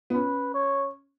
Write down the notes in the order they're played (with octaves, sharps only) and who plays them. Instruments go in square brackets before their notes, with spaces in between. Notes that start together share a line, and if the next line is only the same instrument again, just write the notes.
[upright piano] B3
[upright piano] C#4 [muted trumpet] B4
[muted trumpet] C#5